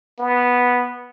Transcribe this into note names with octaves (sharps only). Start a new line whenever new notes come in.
B3